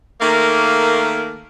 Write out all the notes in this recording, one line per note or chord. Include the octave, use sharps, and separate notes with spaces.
D#3 A3 A#3